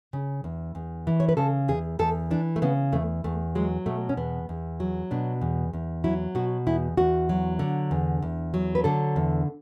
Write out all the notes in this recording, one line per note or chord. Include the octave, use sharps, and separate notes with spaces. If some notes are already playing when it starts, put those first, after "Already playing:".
C#3
E2
E2
E3
C#5
B4
C#3 A4
E2 G#4
E2 A4
E3 D4
A3
C#3 B3
E2 A3
E2 A3
F#3 G#3
B2 A3
C#4
E2 B3
E2
F#3
B2 D4
E2
E2
F#3 E4
B2 F#4
E2 E4
E2 F#4
F#3
D3
E2
E2
F#3
B4
D3 A4
E2